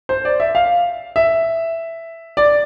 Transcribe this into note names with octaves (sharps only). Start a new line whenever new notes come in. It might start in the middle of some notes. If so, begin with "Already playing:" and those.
C5
D5
E5
F5
E5
D5